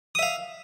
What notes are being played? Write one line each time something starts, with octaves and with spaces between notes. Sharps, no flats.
E5 F5 D#6